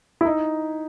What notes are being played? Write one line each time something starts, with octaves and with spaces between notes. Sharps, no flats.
E4
D#4